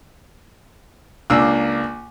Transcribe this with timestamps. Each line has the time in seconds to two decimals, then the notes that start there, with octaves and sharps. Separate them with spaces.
1.30 C#2 A#3 D4 E6